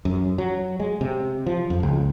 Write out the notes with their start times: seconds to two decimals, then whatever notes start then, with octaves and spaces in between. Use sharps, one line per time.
0.05 F#2
0.38 F#3
0.80 G#3
1.01 C3
1.46 F3
1.70 F2
1.83 C#2